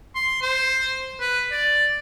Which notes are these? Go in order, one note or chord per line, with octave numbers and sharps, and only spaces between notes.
C6
C5
B4
D5